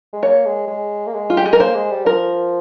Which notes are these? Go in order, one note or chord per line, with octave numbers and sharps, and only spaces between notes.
G#3
A#3 C#5
G#3
G#3
A#3
G#3
F4
G4
G#4
A#4
A#3 C5
G#3
G3
F3 A#4